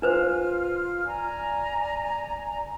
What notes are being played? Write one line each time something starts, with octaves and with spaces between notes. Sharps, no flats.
D4 F4 B4 C5 F6
D5 G#5 A#5